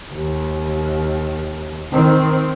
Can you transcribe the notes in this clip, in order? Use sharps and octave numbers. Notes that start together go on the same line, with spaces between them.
D#2
D#3 C4